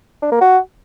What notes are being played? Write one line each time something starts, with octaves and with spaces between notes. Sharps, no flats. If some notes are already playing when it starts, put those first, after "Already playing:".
D4
A#3
F#4